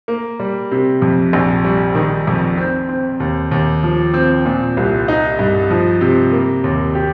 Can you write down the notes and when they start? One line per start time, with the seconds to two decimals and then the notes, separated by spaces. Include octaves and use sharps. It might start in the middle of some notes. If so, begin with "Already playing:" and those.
0.08 A#3
0.40 G3
0.71 C3
1.02 F2
1.33 A#1
1.65 G3
1.95 D#3
2.27 F2
2.57 C4
2.89 C4
3.20 D#2
3.51 D#2
3.83 F3
4.14 C4
4.45 A#2
4.77 C2
5.08 D#4
5.39 G2
5.70 F3
6.01 C3
6.32 A#3
6.64 D#2
6.95 G4